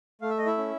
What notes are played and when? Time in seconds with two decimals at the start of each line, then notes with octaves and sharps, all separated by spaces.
0.22 A3 F5
0.30 E5
0.38 D#5
0.46 E4 E5
0.58 C#4